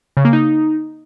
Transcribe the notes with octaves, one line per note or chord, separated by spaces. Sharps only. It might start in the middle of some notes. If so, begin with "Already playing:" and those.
C#3
A#3
D#4